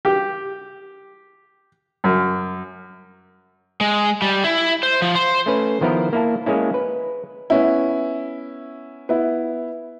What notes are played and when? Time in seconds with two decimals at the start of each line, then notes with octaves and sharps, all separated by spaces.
0.05 G4
2.04 F#2
3.81 G#3
4.22 G3
4.44 E4
4.83 C5
5.02 F3
5.15 C5
5.46 A3 C#4 B4
5.81 D#3 F3 B3 E4 A#4
6.13 A#3 E4 A5
6.46 G#3 A#3 C#4 E4
6.74 B4
7.50 B3 C#4 E4
9.09 B3 E4